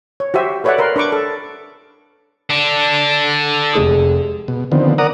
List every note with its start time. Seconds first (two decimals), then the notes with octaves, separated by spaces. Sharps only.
0.20 C#5
0.34 F#4 G4 C5 E5
0.64 A4 B4 C#5 D5 E5 F#5
0.78 A#4 B4 C6
0.96 D4 B4 C#6 D6
1.12 A4
2.50 D4 A4
3.73 F1 G#3 D#6
4.48 B2
4.72 D3 D#3 F3 B3 C4
4.98 A#4 D5 F#5 A#5 D#6